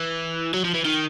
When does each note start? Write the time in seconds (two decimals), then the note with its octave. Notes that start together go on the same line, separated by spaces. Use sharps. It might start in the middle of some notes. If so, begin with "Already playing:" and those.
Already playing: E3
0.54 F#3
0.65 F3
0.74 E3
0.85 D#3